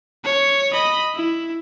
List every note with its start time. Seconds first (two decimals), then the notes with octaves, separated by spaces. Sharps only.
0.25 C#5
0.73 D#5 B5
1.15 E4